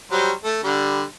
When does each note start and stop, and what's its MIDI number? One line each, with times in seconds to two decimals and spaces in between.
0.12 0.32 54
0.12 0.32 55
0.12 0.32 72
0.44 0.59 57
0.64 1.03 50
0.64 1.03 55